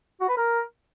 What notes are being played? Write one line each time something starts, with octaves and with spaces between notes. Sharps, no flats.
F#4
B4
A#4